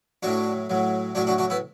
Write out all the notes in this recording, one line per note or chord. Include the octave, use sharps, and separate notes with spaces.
A2 F#3 D4 F#4
A2 F#3
A2 F#3 D4 F#4
D4 F#4
D4 F#4
B3 E4